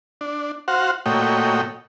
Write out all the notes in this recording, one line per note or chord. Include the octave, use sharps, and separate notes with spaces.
D4
F#4 C5 F5 F#5
A#2 A3 F#4 C#5 D#5 G5